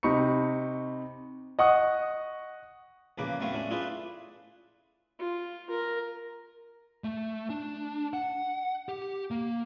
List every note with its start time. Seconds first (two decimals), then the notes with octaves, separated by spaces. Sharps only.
0.03 C3 D#4 B5 C#6 C#7
1.59 D#5 F#5 C#6 D#6
3.18 A#1 E2 C#3 A#3 B4 D6
3.40 F#3 A3 B3 C4 C#5 F5
3.53 A2 A3 C#4 D4
3.70 E4 F4 G#4 B4 D5
5.19 F4
5.70 A#4
7.04 A3
7.50 D4
8.13 F#5
8.89 G4
9.31 A#3